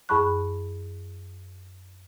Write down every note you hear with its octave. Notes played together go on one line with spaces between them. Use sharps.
F#2 G#4 A5 B5 C#6 F#6